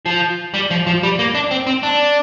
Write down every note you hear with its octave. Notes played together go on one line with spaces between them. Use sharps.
F3
G3
F3
F3
G3
A#3
D4
C4
C4
D4